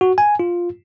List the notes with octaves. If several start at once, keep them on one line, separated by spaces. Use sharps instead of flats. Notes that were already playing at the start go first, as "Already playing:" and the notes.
F#4
G#5
F4